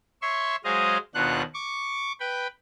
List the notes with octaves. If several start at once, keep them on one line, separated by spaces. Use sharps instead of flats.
C#5 E5 C6 C#6
F#3 G#3 G#4 C5 D#5 F5
D#2 B2 D4 F4 F#5 F#6
C#6 D6
B4 G5 B5